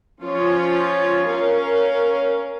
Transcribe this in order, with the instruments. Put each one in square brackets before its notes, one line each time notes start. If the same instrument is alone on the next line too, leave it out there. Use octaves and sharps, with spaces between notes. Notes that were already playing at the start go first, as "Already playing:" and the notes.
[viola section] F3 C#4 F4 C#5
C#4 A#4 C#5 F5